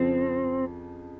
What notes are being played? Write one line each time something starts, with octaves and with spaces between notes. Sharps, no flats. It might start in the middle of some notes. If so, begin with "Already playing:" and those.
Already playing: F2 C#3 F3 C4